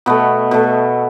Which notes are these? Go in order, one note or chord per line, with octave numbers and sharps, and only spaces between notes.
B2 A3 B3
B2 A3